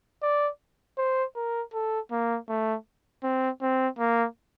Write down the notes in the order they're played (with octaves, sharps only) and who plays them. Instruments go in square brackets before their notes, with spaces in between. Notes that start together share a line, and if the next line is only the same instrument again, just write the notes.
[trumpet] D5
C5
A#4
A4
A#3
A3
C4
C4
A#3